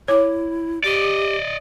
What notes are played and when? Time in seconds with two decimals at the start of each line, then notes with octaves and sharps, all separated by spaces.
0.08 E4 C#5 D6
0.84 G4 D5 D#5